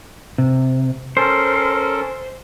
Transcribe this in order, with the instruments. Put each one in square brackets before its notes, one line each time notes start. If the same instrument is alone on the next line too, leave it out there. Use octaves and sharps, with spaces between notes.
[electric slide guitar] C3
[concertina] C#4 A4 A#4 [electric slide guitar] C5